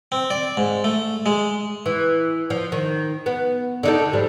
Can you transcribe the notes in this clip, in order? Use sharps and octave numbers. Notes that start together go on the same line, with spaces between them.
C4
D5
G#2
A3
G#3
E3
F3
D#3
B3
D3 D#4 A4
G#2 F3 G3